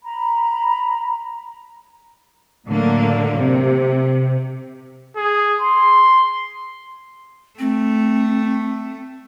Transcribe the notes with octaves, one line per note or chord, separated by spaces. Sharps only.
A#5 B5
A2 D3 F#3 A#3
C3
G#4
C6
A3 C4